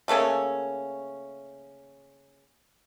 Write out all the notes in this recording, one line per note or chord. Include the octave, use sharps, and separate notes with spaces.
C#3 A3 A#3 C#4